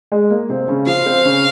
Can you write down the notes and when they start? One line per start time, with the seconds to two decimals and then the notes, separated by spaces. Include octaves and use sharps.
0.12 G#3
0.30 A#3
0.49 C3 C4
0.68 C#3 C#4
0.86 F3 F4 F5
1.06 C4 C5
1.25 C#3 C#4